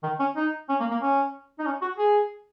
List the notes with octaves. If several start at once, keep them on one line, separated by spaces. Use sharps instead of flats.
D#3
C#4
D#4
C#4
A#3
A#3
C#4
D#4
C#4
F#4
G#4